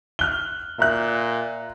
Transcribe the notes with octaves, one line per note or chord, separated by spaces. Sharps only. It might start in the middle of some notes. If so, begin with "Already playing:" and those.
F6 F#6 G7
A#2 E5 A#5 F#6